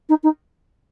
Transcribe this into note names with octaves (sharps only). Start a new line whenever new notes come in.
D#4
D#4